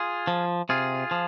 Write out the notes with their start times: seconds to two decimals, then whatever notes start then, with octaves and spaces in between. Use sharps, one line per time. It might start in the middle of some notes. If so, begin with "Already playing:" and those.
Already playing: F4 G#4
0.27 F3
0.69 C3 F4 G#4
1.11 F3